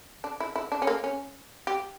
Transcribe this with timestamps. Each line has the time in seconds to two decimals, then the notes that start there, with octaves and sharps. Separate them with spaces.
0.24 D4
0.40 E4
0.56 E4
0.72 D4
0.82 C#4
0.87 A#3
1.04 C#4
1.67 G4